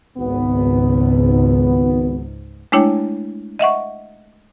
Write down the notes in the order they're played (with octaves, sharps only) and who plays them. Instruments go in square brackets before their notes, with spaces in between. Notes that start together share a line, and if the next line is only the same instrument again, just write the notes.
[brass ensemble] G#1 B3 [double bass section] C#2 G#2
[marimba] G#3 A3 D4 E4 C#5 G5
D#5 E5 F#5 C#6